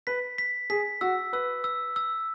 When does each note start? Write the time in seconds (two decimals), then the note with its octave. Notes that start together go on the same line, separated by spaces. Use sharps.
0.07 B4 B6
0.38 B6
0.70 G#4 B6
1.01 F#4 E6
1.33 B4 E6
1.64 E6
1.96 E6